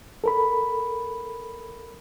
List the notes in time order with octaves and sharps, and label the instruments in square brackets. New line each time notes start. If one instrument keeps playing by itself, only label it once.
[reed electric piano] A4 A#4 B5